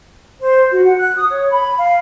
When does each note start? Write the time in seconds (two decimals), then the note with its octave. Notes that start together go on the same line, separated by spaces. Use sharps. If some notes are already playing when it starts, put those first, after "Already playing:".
0.39 C5
0.71 F#4
0.84 F#5
0.96 F#6
1.15 D#6
1.28 C#5
1.49 B5
1.79 F5